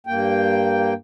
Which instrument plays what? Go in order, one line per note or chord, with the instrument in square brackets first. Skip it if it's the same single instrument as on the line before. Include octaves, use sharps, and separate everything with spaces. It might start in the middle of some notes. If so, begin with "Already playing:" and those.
[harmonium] G2 A#3 G5